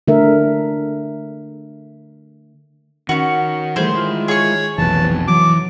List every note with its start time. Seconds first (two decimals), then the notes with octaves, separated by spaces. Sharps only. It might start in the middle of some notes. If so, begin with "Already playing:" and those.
0.08 D3 A3 A#4 E5
3.09 D#3 C#4 F#4
3.76 E3 G3 A3 G#4 C5
3.93 G#3 E4 F4
4.28 G#4 C#5 C#6
4.78 F1 B1 E3 B4 A5
5.28 E3 F#3 D6